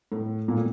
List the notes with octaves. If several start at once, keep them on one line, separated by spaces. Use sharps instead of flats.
A2
A#2
A2